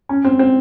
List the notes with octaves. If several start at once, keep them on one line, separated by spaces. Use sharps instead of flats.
C#4
C4
C4